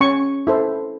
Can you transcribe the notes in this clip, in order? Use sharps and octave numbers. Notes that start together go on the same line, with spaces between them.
C#4 C#6
E4 A4 C5